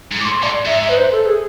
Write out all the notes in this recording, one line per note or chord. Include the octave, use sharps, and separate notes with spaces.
G#2
A2 D6
C6
A2 D5
G#2 E5
E5
B4
C5
A4
G#4